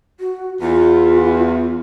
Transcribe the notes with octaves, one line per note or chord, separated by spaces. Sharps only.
F#4
E2 F4